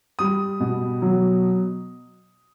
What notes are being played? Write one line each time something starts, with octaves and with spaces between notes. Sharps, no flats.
G3 D#6
B2
F#3